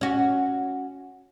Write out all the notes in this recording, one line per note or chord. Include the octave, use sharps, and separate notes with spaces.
C#4 F#4